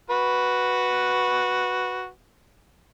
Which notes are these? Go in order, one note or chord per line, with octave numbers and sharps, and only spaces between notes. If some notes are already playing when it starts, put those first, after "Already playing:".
F#4 B4